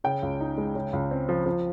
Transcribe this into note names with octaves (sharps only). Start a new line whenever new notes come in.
C#3 G5
C#2
D#4
G#3
C#3
C#2
C4
F3
F3